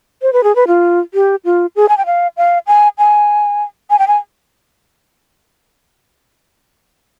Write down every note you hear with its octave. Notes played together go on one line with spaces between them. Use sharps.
C5
B4
G#4
B4
F4
G4
F4
G#4
G#5
G5
F5
F5
G#5
G#5
G#5
G5
G#5